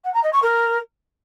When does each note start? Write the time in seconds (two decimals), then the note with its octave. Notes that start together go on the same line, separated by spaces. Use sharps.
0.04 F#5
0.14 A#5
0.23 D#5
0.33 C#6
0.42 A#4